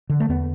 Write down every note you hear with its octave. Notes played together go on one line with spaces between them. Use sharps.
D3
A3
E2 B3